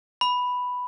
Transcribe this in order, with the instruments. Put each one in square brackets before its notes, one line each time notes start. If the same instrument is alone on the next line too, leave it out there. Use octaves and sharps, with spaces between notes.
[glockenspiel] B5